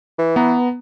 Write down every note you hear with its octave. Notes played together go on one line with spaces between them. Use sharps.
E3
B3 A#5